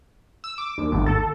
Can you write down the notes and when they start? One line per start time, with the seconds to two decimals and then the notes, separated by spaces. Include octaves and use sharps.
0.44 E6
0.58 D6
0.78 D#2
0.92 G#1
1.06 A4